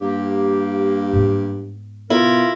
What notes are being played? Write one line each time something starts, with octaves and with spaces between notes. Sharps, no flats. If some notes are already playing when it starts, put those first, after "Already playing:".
G2 A#3 G4
G#2 B3
B2 E4 F4 A#4